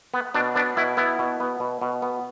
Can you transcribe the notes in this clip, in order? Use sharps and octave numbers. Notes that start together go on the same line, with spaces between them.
B3
B2 D4
B3 D4
B2 E4
B3 E4
B2
B3
B2
B2
B3